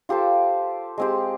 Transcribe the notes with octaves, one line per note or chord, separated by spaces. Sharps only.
F4 G4 A4 C5
G#3 C4 G4